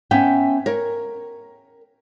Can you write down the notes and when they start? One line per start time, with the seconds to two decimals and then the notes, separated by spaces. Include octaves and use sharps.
0.11 B3 C#4 E5 G5
0.66 A#4 C#5